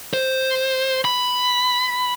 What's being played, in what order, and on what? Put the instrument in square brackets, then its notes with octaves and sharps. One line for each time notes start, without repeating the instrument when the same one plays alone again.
[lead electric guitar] C5
B5